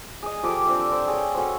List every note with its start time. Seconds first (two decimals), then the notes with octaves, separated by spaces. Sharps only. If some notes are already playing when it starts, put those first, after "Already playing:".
0.23 G#4 D#5
0.43 F3 G4 A4 D6
0.67 C4 D4 E5
0.92 C5
1.08 G#4 C#5 G5
1.35 C#4 F#4 A4 C5